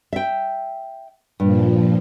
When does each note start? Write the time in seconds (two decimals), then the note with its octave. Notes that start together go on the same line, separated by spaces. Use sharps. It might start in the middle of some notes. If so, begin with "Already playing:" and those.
0.13 E5 G5
1.40 G2 A#2 F3